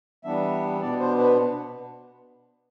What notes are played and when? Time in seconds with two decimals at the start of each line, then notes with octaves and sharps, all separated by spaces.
0.24 E3 G3 B3 D4 E5
0.81 B2 B3 D4 D5
1.00 C5
1.19 B4